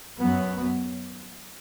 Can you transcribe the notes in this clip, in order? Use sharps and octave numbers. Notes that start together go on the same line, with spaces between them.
F#2 F#3 B3